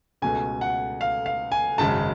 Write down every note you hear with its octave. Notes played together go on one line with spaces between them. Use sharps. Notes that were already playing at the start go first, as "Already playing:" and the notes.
C#2 B2 A3 G#5
F#5
F5
F5
G#5
G#1 F#2 C#3 G#3 A5